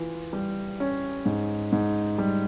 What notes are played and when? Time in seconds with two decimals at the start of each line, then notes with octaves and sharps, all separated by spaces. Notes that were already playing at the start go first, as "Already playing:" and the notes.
Already playing: E3 F4
0.33 G3
0.80 C#4
1.25 G#2
1.72 G#2
2.18 G3